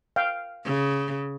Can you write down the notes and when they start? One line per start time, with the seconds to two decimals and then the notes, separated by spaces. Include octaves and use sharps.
0.16 F5 G5
0.65 C#3